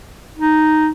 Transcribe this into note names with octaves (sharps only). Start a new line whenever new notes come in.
D#4